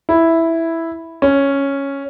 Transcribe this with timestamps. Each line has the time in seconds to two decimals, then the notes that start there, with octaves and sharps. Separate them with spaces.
0.09 E4
1.22 C#4